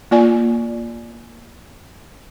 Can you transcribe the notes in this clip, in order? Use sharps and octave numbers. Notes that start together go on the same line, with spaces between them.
A#3 F4 D5 G#5